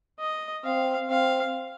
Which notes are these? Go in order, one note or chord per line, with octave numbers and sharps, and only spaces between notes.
D#5
C4 F5
C4 F5